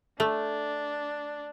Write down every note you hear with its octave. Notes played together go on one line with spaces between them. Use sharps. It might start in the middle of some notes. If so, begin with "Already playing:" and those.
A3 D4